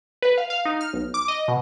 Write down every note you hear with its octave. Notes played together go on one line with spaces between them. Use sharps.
B4
F5
F5
D#4
F6
B1
D6
D#5
B2